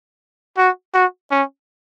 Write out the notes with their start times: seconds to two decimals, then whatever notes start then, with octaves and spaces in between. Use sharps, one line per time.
0.58 F#4
0.94 F#4
1.31 C#4